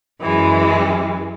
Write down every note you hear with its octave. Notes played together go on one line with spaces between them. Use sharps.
F#2 E3 G#3